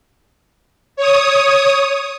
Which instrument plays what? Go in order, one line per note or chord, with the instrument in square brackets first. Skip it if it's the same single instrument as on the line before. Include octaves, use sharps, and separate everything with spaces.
[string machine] C#5 D#6